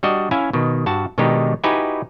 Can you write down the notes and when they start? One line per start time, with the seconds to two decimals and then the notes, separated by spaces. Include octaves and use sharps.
0.03 G3 D4 F#4 D#5
0.31 C#4 E4 E5 F5 G#5
0.53 B2 D#3
0.86 G2 F#4 A5
1.18 B2 D#3 G#3 D4 D#4 G4
1.64 D#4 E4 F#4 G4 B4 G#5